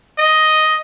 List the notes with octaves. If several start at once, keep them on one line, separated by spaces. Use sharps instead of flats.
D#5